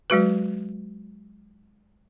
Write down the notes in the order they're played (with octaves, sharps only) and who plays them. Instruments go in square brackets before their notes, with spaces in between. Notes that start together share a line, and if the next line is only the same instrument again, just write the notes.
[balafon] F#3 G#3 F#4 B4